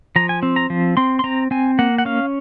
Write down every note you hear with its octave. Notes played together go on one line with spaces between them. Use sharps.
F3 A#5
G#5
C4
A#5
F3
C4 C6
C6
C4 A#5
C4 G#5
A#3 F#5
F#5
C#4 F5